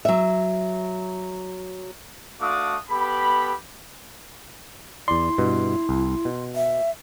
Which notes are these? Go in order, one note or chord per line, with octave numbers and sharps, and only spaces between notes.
F#3 E5
A3 D4 F#4 F5 D6 D#6
B3 G4 A4 B5
E2 E4 D5 C6
G2 B2
C2
B2
E5